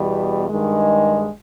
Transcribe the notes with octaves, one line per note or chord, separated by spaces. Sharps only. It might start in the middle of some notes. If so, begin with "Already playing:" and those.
Already playing: E2 B2 G3
G2 D#3 G#3